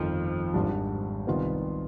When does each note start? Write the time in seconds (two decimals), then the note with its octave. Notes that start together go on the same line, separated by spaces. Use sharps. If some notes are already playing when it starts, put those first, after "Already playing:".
Already playing: G1 F2 D#3 F3
0.54 G#1 G#2 G3 D4
1.27 C2 C3 D#3 B3 F4